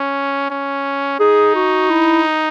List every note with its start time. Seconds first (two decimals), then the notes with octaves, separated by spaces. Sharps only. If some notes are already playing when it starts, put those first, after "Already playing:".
Already playing: C#4
0.50 C#4
1.20 D#4 G#4
1.55 F#4
1.90 E4